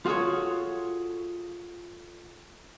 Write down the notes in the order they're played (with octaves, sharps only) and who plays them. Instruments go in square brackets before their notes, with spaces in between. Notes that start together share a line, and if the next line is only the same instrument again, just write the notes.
[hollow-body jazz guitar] F4 F#4 G#4 A4 C#5